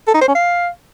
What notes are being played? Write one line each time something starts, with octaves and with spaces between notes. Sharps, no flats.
A4
D#4
C5
C#4
F5